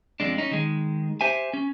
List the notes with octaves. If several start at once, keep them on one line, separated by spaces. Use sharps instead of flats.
F2 G#3 D4
C#4 D#4
D#3 G#3
G4 C5 E5 G#5
C#4